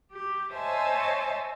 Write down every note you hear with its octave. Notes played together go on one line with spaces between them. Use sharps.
G4
C5 C#5 D#5 E5 G#5 A5